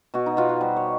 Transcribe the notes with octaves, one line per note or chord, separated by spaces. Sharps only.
B2 F#4
D#4
B2 F4
F#4
G3 C5
C#5